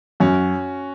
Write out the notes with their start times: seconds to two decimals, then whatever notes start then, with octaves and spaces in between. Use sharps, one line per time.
0.20 F#2 C#4 F#4